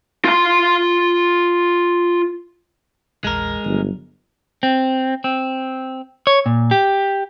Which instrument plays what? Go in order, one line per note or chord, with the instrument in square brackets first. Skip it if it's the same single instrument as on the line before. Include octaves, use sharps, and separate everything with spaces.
[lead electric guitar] F4 C6
[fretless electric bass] A#1 E2 [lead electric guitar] G#3 A#4
[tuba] G1 [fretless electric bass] F#3
[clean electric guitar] C4
C4
C#5
A#2
G4